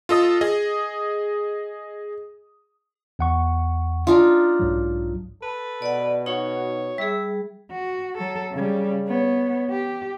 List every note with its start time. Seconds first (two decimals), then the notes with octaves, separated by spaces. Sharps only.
0.09 F4 A4 D#5 D#6
0.41 G#4 D#5
3.19 E2 F#5 C#6
4.07 D4 D#4 F4
4.60 B1 G#2 F#3
5.42 A4 B4
5.82 B2 D5 F#5
6.26 D#4 F#4 C#5
6.98 G3 G#4 E5
7.72 F#4
8.18 F#3 A4
8.52 C#3 G3
9.07 B3 C#5
9.70 G4